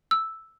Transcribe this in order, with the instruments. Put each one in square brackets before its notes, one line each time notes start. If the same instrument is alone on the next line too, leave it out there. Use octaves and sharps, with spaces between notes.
[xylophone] E6